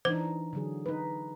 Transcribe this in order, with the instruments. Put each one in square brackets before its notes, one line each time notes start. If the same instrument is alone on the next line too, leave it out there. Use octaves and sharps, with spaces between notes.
[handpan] E3 D4 D#4 [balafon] C5
[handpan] D3 F#3 G#4
D#4 B4